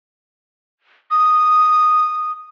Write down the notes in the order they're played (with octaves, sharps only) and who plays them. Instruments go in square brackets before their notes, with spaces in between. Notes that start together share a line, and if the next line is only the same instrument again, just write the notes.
[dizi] D#6